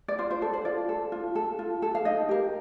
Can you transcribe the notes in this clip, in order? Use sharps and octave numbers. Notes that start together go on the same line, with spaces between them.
D5
F4 C5
C5
A4 D5
C5
F4 D5
A4
F4
A4
F4
A4
F5
D#4 D#5
G4 A#4